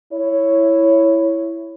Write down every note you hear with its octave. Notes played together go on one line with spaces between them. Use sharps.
E4 C#5